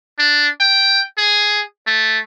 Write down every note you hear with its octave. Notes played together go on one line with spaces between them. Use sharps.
D4
G5
G#4
A3